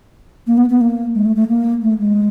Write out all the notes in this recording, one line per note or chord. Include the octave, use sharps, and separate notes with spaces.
A#3
B3
B3
A#3
G#3
A3
A3
A#3
A3
G#3